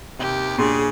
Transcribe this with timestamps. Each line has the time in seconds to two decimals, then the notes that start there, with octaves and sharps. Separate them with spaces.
0.19 D#2 C3 G4
0.58 A#2 C#3 D4 G#4 C6